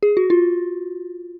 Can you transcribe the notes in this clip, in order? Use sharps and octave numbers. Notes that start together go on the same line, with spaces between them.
G#4
F#4
F4